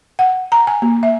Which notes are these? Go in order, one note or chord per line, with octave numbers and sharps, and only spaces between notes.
F#5
A#5
G#5
A#3
E5